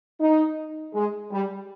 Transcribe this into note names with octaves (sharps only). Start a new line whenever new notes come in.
D#4
G#3
G3